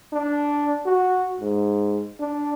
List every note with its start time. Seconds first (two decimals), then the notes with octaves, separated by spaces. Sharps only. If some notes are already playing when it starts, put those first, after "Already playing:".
0.13 D4
0.85 F#4
1.40 G#2
2.19 D4